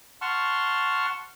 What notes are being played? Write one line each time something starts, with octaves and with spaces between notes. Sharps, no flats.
F#5 A5 C6 C#6 F6